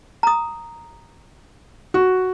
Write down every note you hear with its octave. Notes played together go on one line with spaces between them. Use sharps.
A#5 D#6
F#4